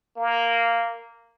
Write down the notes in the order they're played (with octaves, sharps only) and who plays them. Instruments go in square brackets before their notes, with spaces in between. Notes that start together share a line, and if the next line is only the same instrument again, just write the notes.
[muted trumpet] A#3